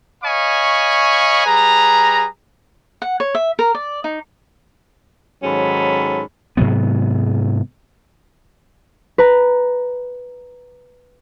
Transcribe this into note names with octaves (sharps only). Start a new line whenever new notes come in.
C#5 D#5 F5 G#5 B5 C#6
G3 G#4 B4 A#5
F#5
C#5
E5
A#4
D5
D#4
G#2 D#3 F#3 C#4 A4 B5
G#2 C3 F#3 B3
B4 A#5